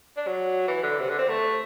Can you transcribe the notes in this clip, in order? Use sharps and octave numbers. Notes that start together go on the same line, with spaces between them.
D4
F#3
E3
D3
C3
D3
C4
A3